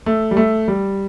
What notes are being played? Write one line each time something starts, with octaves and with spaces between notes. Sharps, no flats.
A3
G3
A3
G3